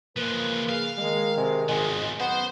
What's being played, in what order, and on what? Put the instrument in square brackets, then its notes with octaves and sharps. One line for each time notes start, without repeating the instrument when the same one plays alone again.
[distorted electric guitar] F3 G#3 [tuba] A#3 [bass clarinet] B4
[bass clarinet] C#3 [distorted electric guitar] F5
[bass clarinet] D#3 [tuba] G#3
[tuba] C3 [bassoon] G#3
[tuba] G#1 [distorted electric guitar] F3 B3 [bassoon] G#3
[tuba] F#2 [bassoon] B3 [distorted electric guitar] C5